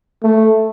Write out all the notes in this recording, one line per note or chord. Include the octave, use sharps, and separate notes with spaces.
A3